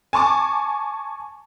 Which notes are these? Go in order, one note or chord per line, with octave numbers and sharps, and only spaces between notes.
G#5 A5 C#6 D6